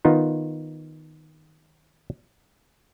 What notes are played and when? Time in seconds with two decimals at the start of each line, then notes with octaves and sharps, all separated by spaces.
0.05 D#3 B3 D#4 F4